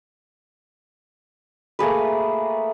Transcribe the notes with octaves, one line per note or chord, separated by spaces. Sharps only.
A3 A#3 G#4 B4